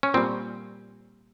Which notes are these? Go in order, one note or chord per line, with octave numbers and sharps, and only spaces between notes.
C#4
A#2 G3 C4